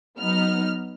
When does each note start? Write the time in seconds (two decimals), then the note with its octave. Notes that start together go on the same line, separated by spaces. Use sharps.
0.19 F#3 B3 D#4 F6